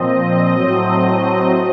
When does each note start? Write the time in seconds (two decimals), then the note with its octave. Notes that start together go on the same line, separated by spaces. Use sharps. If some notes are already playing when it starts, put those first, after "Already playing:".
Already playing: A#2 F3 C4 D#5
0.54 A2 F#3 A3 C4 D#5